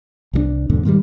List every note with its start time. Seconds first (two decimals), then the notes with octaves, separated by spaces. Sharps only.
0.33 C2 F3 D4
0.70 E2 G#2 B2 D3
0.85 G#2 D#3 E3 G3